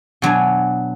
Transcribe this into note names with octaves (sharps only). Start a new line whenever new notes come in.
B2 F#3 D4 G#5